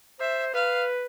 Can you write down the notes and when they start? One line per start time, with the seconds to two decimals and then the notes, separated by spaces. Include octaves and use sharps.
0.20 C5 E5
0.54 B4 F5